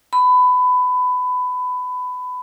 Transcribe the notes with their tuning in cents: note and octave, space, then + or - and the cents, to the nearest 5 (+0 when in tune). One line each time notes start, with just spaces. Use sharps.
B5 +20